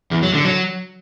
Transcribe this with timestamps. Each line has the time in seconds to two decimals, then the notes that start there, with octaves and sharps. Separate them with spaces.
0.11 E2
0.22 F#3
0.34 D3
0.45 F#3